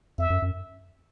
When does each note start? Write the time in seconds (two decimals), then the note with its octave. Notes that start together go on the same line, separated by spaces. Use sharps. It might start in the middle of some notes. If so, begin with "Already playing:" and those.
0.18 F2 E5
0.30 F#2
0.42 F#2